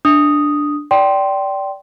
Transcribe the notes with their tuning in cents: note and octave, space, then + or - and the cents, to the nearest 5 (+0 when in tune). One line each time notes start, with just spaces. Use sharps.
D4 +0 D#6 +0
D5 -15 G5 -15 C6 +0